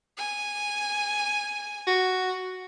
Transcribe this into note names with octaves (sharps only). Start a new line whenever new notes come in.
G#5
F#4